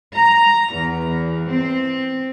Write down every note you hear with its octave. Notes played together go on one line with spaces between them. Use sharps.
A#5
E2
C4